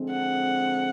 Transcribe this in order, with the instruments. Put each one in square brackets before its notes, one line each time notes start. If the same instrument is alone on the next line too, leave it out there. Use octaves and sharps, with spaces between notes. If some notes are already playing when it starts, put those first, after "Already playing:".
Already playing: [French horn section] D3 F3 G#3 C4
[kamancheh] F#5